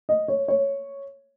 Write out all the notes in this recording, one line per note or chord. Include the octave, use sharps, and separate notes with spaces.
D#5
C#5
C#5